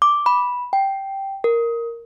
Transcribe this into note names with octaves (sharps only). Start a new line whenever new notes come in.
D6
B5
G5
A#4